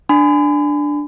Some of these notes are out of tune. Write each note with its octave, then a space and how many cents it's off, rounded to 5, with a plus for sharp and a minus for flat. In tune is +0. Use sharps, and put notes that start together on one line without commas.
D4 +0 G#5 +0 B5 +40